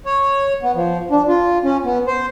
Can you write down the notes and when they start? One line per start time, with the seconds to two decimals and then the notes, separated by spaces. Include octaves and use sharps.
0.06 C#5
0.63 B3
0.75 F3
1.11 D4
1.28 F4
1.64 C#4
1.84 B3
2.07 C5